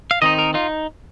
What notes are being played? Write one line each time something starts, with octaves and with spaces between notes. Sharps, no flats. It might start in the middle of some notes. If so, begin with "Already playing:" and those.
F5
D#3 C4 D#4 D#5
A#4
D#4 F4